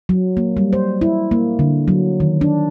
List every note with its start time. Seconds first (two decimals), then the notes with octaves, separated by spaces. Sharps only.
0.09 F#3
0.37 A#3
0.57 G3
0.73 C5
1.01 E4
1.31 A#3
1.59 D3
1.88 F#3
2.20 D#3
2.41 D4